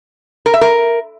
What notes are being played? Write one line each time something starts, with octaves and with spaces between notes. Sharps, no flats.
A#4
E5
A#4